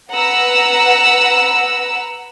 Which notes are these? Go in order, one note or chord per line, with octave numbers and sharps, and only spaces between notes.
B4 F#5 A#5 E6